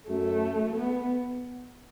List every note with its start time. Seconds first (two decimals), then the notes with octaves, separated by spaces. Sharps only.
0.09 F#2 A3
0.77 B3